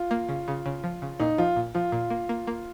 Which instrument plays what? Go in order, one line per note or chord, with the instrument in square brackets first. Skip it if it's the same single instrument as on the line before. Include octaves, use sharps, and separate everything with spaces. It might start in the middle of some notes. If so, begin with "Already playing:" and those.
Already playing: [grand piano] F4
[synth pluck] A#3
C#3
C#3
C#3
F3
C#3
[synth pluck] A#2 [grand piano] D#4
[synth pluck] F3 [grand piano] F4
[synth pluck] A#2
[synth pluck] F3 [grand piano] F4
[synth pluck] A#2
A#3
A#3
A#3